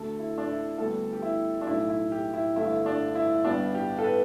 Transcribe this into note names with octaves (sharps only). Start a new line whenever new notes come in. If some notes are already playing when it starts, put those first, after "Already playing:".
Already playing: D2 D3 A3 A4
E4
D4
E4
D2 D3 G3 B3 A4
G4
E4
D4
B1 A2 A3 E4
E4
G4
E4
G1 G2 D3 A3 E4
D4
E4
G1 G2 G3 B3 D4
G4
A4
B4